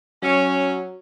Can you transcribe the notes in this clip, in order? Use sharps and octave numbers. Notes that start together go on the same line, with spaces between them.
F#3 C#4